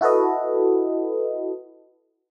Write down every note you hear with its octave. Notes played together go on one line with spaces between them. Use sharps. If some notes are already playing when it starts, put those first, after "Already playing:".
E4 F#4 A4 B4 D#5